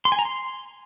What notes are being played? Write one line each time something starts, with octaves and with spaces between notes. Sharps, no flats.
C6
G#5
A#5
C6